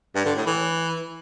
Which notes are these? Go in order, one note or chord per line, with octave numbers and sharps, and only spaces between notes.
G2
D3
A2
E3